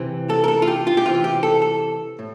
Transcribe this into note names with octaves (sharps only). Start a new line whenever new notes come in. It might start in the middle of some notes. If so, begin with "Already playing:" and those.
Already playing: C3 E3
A4
A#4
A4
F4
G4
F4
G4
C3 E3 F4
G4
A4
A4
A2